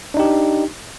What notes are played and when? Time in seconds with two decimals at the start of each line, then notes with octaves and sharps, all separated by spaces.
0.14 D4
0.17 D#4
0.19 G4